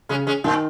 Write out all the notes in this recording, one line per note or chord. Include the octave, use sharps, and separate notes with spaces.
C#3 G#3 C#4
G#3 C#4
A#2 D#3